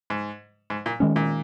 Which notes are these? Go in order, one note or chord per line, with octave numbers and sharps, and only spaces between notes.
G#2
G#2
A#2
D#3 G#3 C#4
A#2